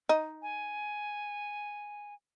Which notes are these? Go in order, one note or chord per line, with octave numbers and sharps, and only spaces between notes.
D#4
G#5